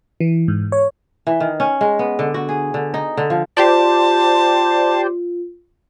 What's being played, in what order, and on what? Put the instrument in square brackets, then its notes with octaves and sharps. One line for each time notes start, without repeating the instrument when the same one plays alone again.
[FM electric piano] E3
G#2
C#5
[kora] E3
D#3
C#4
G#3
B3
D3
F#4
G#4
D3
D#4
D3
F3
[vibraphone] F4 [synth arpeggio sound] G4 C5 D5 [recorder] A5